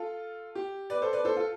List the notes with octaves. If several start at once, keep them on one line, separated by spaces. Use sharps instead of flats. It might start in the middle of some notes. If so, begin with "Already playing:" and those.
Already playing: F4 A4
G4
B4 D5
A4 C5
B4 D5
A4 C5
F4 A4